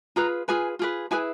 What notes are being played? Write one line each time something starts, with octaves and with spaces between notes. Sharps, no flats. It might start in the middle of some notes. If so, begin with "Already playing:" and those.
F4 G#4 B4 A#5
F4 G#4 B4 G#5
F4 G#4 B4
E4 G#4 B4 G#5